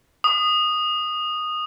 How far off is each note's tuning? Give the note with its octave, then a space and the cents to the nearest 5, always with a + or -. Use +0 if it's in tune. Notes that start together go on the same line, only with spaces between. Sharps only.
D#6 -10